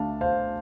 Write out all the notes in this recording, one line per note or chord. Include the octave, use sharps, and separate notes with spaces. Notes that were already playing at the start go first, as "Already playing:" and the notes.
Already playing: D2 D3 A3 D4 F5 A5
C5 F5